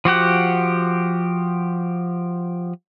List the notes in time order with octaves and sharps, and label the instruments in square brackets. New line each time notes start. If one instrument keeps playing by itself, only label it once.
[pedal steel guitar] F3 F#4 G4 F#5